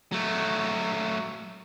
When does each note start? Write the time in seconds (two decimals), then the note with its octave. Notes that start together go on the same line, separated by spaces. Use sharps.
0.12 F#3 A3